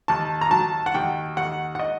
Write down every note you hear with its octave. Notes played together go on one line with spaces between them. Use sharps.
D#2 A5
A#5
F#3 A5
F#5
D#2 G5
D#2 F#5
F#5
D#5